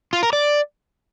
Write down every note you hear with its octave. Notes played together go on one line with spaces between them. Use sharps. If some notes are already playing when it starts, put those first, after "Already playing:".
F4
A#4
D5